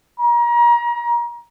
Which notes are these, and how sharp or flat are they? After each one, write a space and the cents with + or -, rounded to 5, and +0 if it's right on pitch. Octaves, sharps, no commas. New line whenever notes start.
A#5 +30